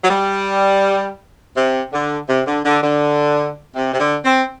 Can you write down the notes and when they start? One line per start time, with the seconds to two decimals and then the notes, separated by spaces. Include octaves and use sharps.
0.04 F#3
0.09 G3
1.56 C3
1.93 D3
2.29 C3
2.47 D3
2.65 D3
2.83 D3
3.75 C3
3.93 C3
3.99 D3
4.25 C4